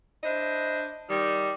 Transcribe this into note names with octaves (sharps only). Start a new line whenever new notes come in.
D4 E4 C5 D#5
D#3 G3